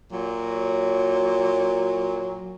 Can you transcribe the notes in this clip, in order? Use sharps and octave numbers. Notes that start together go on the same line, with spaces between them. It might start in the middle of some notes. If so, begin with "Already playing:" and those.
A#2 F#3